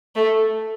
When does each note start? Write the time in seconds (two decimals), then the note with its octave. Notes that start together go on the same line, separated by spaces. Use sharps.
0.15 A3